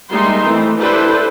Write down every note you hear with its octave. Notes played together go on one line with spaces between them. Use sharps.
G3 G#3 A#3 D#4 E5 C6
E3 A3 C4
D4 E4 G4 A4 B4 C5